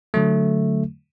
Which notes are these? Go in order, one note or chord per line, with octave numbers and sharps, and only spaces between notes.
D3 F#3 A3